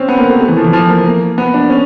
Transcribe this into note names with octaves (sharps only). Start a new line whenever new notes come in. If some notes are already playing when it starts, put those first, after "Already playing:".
Already playing: C4 C#4
B3
A#3
A3
A3
E3
F3
E3
F3
A#3
A#3
B3
D4
C#4